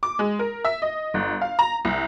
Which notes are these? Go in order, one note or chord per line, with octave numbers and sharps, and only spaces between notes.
D6
G#3
A#4
E5
D#5
G1
F5
A#5
C2